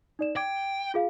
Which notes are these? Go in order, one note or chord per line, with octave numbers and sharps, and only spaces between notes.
D#4 D5 E7
G5 D6 G#6 D7
F4 G#4 F5